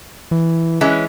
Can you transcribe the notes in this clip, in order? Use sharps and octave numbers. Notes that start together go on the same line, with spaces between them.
E3
E3 G#3 C#4